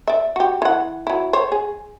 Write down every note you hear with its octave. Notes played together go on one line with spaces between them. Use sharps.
D5 E5
F#4 G4
E3 F#5
F#3 E4
C5 C#5
G#4